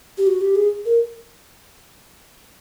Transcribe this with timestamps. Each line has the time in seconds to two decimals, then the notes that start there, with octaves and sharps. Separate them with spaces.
0.18 G4
0.27 F#4
0.41 G4
0.55 G#4
0.86 A#4